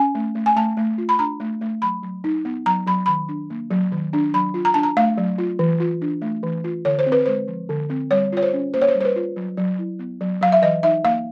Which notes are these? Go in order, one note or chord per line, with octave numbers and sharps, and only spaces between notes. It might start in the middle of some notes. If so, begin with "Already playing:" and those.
Already playing: C#4 G#5
A3
A3
G#5
A3 A5
A3
F4
B5
D4 A#5
A3
A3
F#3 B5
F#3
D#4
B3
F#3 A#5
F#3 B5
D#3 B5
D4
A#3
F#3
D#3
D4
F#3 B5
F4
A#5
D4 A5
A#5
A3 F5
F#3
F4
E3
F4
D4
A3
E3
F4
D3 C#5
C5
C4
B4
G#3 C5
F3
D3
C4
G3 C#5
F4 C#5
C5
C#4
A#3 C5
C#5
C5
G3
C5
B4
F4
F#3
F#3
E4
B3
F#3
F#3 F5
E5
E3 D#5
D#4 E5
A#3 F5